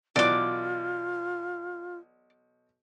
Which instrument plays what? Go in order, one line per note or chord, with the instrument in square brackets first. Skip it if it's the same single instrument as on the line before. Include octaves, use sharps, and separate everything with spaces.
[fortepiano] B1 E3 F#6 [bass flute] F4 [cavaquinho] D5 D6